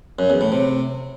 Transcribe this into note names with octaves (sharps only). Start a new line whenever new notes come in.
F#2
E2
A2
C3